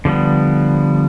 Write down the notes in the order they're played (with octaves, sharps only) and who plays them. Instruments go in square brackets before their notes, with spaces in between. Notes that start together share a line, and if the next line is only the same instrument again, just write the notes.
[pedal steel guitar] D3 F3 G3 B3